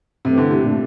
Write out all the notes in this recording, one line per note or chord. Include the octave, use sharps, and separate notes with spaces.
G2 C3 E3 A3 C4 G4
D3
C3
A#2 A3 D4